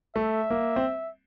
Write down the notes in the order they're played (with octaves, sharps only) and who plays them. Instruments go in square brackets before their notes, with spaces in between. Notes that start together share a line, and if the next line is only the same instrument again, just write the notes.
[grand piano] A3 [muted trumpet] E5
[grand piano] A#3
C4